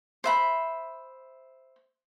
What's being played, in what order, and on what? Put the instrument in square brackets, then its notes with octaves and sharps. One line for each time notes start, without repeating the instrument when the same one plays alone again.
[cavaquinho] C5 E5 B5